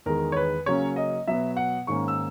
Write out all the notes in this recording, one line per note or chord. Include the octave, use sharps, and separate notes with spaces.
E2 D#3 G#3 A#4
C#5
B4
C#3 F#3 A#3 C#4 C#5
D#5
B2 F#3 B3 E5
F#5
G#2 D#3 A#3 C#4 C#6
E6